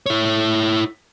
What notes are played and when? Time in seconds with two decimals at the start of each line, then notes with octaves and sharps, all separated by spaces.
0.06 E4 C#5